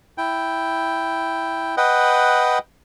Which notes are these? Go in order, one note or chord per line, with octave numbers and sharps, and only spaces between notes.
E4 G5
B4 D#5 F#5 G5